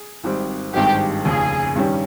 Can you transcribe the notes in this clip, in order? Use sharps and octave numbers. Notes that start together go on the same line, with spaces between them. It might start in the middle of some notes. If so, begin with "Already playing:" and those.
Already playing: G#4
G#1 G#2 G3 C4
G#1 G2 D#3 G#3 C4 G4
F1 D#2 C#3 G#4
G2 D#3 G3 C#4 G4